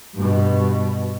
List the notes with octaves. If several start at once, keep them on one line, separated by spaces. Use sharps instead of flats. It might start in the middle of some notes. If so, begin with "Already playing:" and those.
G2 B2